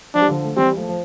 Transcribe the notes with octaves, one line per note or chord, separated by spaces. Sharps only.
F3 D4
G3
D3 F3
A3
E3 G3 C4
F3 A3
F3